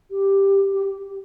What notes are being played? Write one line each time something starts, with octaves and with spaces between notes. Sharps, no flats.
G4
G4